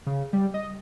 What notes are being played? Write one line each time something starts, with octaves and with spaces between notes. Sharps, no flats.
C#3
G3
D#5